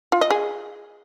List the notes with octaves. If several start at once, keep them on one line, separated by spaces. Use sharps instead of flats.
F4
D#5
G#4